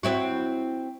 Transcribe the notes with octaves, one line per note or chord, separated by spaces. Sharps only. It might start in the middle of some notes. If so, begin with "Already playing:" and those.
C4 E4 F#4